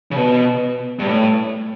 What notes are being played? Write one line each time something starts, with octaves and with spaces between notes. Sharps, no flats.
C#3
B2
G2
A2